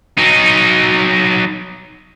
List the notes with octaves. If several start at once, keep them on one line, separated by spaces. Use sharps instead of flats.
F#3 D#4